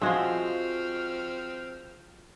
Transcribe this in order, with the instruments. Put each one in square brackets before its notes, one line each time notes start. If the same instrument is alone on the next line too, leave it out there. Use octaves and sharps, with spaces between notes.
[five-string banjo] E3 F3 [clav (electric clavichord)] G#3 [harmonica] C4 F6 [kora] F#4 E5